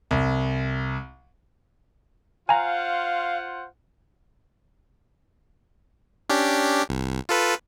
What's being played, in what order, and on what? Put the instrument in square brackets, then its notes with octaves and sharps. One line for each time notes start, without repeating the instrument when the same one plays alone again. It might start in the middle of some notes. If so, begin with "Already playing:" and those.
[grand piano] C2
[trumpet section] F4 C5 F#5 [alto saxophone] F5 [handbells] G#5 A#5
[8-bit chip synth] C#4 D4 G4
C2
F4 A4 B4